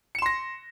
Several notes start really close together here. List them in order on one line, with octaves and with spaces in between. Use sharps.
C#7 E7 C6 A#6